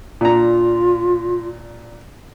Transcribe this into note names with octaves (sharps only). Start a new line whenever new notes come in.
A#2 D4 F4 A#5